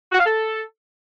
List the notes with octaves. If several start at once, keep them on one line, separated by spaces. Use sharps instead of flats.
F#4
F5
A4